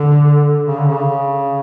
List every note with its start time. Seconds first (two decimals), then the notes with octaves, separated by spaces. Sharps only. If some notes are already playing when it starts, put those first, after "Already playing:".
Already playing: D3
0.67 C#3
0.78 D3
0.88 C#3